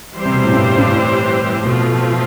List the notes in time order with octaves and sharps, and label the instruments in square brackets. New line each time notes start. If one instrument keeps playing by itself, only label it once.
[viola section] E3 G3 C4 G4 C5
[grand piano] C3
B2
A2
G2
G2
A2
[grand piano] B2 [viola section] F3 A3 C4 F4